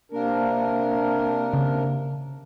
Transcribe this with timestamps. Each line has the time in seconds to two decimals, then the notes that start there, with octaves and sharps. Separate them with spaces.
0.12 C3 A#3 D4 A#4 F5
1.53 C#3